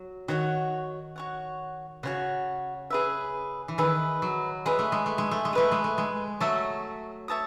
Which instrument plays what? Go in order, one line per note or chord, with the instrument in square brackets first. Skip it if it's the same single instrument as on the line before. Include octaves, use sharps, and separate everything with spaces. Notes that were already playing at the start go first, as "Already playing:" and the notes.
Already playing: [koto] F#3
[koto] D#3 [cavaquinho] F#4 C#5 F#5
[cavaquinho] F#4 C#5 F#5
[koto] C#3 [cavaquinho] F#4 C#5 F#5
[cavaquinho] G#4 B4 E5
[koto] E3
[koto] D#3 [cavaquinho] G#4 B4 E5
[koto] F#3
[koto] G#3 [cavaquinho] G#4 B4 E5
[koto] A3
G#3
A3
G#3
A3
G#3
[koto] A3 [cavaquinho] G#4 B4 E5
[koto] G#3
A3
G#3
[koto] F#3 A3 [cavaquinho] C#5 E5 A5 D#6
[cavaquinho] C#5 E5 A5 D#6